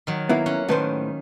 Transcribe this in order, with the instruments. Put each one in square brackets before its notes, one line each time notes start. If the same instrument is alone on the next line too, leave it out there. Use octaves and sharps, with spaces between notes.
[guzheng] D#3 F#3
[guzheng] A#3 [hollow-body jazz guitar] B3 E4
[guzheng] C#4 F#5
[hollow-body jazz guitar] A2 B4 C5 [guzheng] D#3